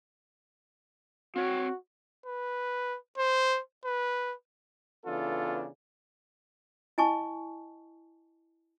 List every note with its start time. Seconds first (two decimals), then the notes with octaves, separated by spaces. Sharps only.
1.36 C4 F#4 C#5 G5
2.26 B4
3.18 C5
3.85 B4
5.06 C#3 E3 B3 D4 F4 A4
6.98 E4 D#5 G#5 A5 C#6